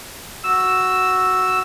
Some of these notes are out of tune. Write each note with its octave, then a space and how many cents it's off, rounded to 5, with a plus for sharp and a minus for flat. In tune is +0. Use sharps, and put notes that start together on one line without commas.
F#4 +0 E6 +0